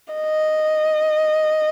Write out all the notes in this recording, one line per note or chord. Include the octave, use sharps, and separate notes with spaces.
D#5